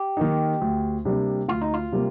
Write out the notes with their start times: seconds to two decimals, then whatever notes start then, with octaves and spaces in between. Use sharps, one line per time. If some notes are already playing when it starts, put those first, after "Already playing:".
Already playing: G4
0.17 D#3 A#3 D#4
0.61 D2
1.05 C3 G3 A#3 D4
1.48 D2 F4
1.62 D#4
1.74 F4
1.92 C3 G3 A#3